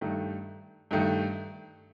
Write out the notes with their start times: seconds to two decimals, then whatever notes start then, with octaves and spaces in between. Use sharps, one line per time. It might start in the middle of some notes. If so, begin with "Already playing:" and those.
0.01 G2 D#3 A3
0.91 G2 D#3 A3